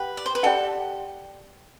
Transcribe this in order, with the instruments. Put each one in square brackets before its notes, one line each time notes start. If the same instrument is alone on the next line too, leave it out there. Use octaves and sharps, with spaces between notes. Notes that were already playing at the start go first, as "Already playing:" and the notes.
Already playing: [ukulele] G4 F#5 [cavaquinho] B4
[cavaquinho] D5
C5
B4
[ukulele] G4 D5 F#5 [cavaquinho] A4